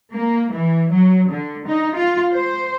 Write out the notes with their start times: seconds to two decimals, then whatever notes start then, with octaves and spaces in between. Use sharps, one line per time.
0.12 A#3
0.52 E3
0.92 F#3
1.30 D3
1.67 D#4
1.96 F4
2.33 C5